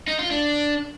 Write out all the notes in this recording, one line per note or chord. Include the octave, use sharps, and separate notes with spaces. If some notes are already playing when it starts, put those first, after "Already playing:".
D#4
F4
D4